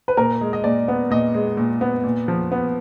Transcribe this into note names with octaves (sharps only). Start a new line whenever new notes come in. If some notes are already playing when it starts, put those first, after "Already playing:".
B4
A#2 A#4
G#3
D#5
A#2 D5
B3
A#2 D#5
G#3
A#2
B3
A#2
F3
B3